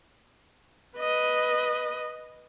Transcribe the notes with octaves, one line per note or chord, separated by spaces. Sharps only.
B4 D#5